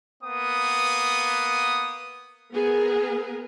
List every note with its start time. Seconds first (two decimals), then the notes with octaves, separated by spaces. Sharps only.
0.23 A#3 B3 D#6
2.53 B3 G#4 A#4